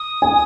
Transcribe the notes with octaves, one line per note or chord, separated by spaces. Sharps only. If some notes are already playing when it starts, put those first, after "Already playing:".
Already playing: D#6
G#5